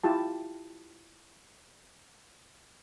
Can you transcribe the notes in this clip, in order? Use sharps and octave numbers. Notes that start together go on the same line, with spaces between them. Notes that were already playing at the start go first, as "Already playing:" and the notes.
E4 F4 G4 A5